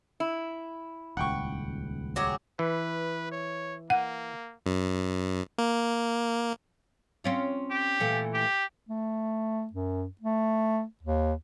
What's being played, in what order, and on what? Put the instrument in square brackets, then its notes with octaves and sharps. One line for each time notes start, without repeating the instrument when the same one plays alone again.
[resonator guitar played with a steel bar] E4
[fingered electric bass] D#1 C#2 [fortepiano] F#5 G5 C#6
[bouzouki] F#3 G4 G#4
[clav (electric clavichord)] E3 [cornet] B4
[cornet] C#5
[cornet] A#3 [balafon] F#5
[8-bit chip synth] F#2
A#3
[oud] C4 C#4 F4
[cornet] G4
[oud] A#2 E3 A3
[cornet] G4
[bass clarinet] A3
F#2
A3
D#2